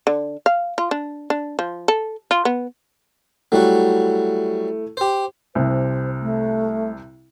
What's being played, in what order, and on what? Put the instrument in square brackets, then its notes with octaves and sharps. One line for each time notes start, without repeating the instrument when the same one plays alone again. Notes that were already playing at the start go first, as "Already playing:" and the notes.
[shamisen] D3
F5
F4
D4
D4
F3
A4
F4
B3
[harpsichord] F#3 G3 F#4 [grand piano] A3 E4
[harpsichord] G4 C5
[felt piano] C2 C3 [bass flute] C5
[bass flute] A3